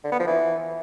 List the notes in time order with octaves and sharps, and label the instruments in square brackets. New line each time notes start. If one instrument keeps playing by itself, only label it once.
[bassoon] D3
B3
F3
E3